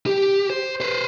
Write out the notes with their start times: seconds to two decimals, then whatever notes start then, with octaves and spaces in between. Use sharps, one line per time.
0.06 G4
0.50 C5
0.81 B4 C5